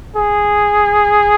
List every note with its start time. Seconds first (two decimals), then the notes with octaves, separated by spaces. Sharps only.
0.16 G#4